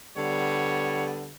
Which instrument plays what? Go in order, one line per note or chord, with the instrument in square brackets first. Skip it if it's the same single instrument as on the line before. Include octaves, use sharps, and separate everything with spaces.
[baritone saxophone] D3 [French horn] G3 [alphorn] B3 [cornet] C#5